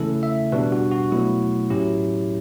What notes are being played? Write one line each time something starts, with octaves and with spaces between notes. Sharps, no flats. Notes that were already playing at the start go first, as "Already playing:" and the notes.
Already playing: C#3 E3 A3 C#4 E4 A4
E5
B2 G3 D4 B4
F#4
F#4
B2 F#3 A3 E4
A2 F#3 C#4 E4 G4